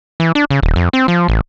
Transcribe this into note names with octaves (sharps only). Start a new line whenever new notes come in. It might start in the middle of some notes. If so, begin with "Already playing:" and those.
E3
D4
C#3
D#1
F2
C4
F3
A1